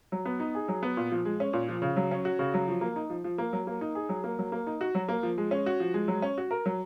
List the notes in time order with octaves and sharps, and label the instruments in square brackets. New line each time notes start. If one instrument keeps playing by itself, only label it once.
[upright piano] F#3
B3
D#4
G#4
F#3
B3
A#2
F3
G#3
C#4
A#2
F3
C#3
F#3
C#4
F#4
C#3
F#3
F3
A#3
D#4
F3
F3
A#3
F#3
A#3
D#4
G#4
F#3
A#3
F#3
A#3
D#4
F#4
F#3
A#3
F3
G#3
C#4
F#4
F3
G#3
F#3
C#4
F#4
A#4
F#3